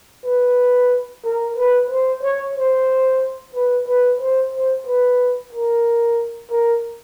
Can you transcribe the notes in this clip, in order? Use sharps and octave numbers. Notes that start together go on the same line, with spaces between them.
B4
A#4
B4
C5
C#5
C5
B4
B4
C5
C5
B4
A#4
A#4